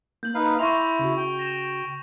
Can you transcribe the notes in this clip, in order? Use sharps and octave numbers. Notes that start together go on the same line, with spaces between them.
A#3 G6 F#7
D#4 B4 F5
E4 E5 G5 C6 C#6 A#6 F7
C#3 F#4
G5
A#6 E7